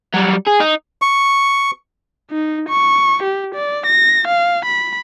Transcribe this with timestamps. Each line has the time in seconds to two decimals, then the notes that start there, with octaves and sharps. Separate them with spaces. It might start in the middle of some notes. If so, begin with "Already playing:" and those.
0.14 F#3 G3
0.47 G#4
0.60 D#4
1.02 C#6
2.31 D#4
2.69 C#6
3.23 G4
3.55 D5
3.87 A#6
4.28 F5
4.66 B5